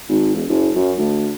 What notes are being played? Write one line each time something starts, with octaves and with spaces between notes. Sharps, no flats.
G#1
E1
F#1
F#2
D2